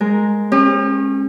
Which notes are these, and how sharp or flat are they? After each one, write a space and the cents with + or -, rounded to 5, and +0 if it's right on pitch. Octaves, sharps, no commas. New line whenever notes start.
G#3 +0 A#4 +0
C#4 -30 G4 +35 D#6 -45